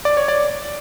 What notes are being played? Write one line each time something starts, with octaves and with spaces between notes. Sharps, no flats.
D5
C#5
D5